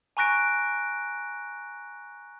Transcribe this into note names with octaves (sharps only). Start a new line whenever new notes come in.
G#5 A#5 C#6 F#6 A#6 D7